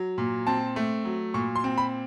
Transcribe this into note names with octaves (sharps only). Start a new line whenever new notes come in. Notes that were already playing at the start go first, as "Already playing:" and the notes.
Already playing: F#3
A#2
C4 A5
A3
F#3
A#2 C#6
C6
C4
B5